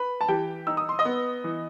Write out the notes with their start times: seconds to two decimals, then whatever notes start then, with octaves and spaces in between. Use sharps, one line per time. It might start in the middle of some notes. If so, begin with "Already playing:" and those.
Already playing: B4 B5
0.21 A5
0.28 E3 G4 G5
0.67 D#4 E6
0.77 D#6
0.89 C6
0.99 D#5 D#6
1.05 B3
1.44 E3